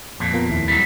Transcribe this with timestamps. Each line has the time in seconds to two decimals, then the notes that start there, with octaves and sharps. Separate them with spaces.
0.20 F2 A#2
0.33 B3 F4 A#4
0.50 D#2 E4
0.68 F#3 G3